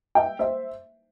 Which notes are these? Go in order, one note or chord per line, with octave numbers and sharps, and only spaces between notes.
E5 G5
C5 E5